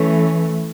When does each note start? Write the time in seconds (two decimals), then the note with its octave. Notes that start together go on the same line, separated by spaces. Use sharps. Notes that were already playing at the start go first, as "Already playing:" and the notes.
Already playing: E3 A3 C#4